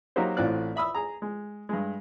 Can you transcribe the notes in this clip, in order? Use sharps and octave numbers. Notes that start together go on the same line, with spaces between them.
F#3 A#3 D#4 F#4 G4 C5
A1 A2 C4 F4 D5 F#6
E5 B5 D#6 E6
G#4 A#5
G#3
G2 G#3